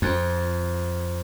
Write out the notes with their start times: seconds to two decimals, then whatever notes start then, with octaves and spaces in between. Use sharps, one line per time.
0.02 F2